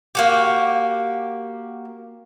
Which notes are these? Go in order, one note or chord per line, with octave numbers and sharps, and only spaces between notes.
A#3 F#4 G4